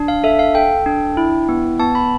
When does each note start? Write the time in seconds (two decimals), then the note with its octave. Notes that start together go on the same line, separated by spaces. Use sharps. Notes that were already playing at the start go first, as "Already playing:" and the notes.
Already playing: D4
0.08 F5
0.24 A4 E5
0.39 F5
0.55 A4 G5
0.86 D4
1.17 E4
1.49 B3
1.80 B3 A5
1.95 B5